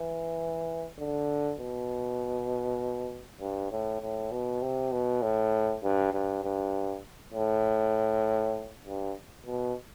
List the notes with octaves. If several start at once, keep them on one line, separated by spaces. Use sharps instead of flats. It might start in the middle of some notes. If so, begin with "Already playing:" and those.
Already playing: E3
D3
B2
G2
A2
A2
B2
C3
B2
A2
G2
G2
G2
A2
G2
B2